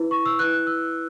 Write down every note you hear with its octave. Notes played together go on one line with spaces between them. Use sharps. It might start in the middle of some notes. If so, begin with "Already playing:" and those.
Already playing: E4 B4
C#6
E6
E4 B4 F#6
F#6
E6